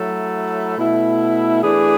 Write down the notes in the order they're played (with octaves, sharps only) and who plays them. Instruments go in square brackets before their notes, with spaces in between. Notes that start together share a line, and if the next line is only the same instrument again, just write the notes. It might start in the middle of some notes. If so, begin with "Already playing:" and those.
Already playing: [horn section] F#3 A3 E4
B2 A3 E4
E3 A3 D4 G#4